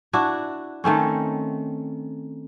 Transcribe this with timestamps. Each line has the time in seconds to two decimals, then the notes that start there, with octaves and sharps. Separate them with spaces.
0.13 D4 E4 F#4
0.84 D#3 A3 C4 C#4